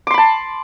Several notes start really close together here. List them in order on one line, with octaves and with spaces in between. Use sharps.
D6 C6 B5 A5